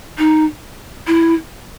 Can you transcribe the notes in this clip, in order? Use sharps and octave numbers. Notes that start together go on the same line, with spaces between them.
D#4
E4